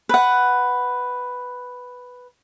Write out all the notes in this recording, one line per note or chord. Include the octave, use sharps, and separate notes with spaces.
B4 F#5